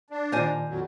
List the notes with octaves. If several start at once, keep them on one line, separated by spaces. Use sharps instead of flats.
D4
A#2 D#3 A#4 C5 D5 F#5 G#5
F2 F#3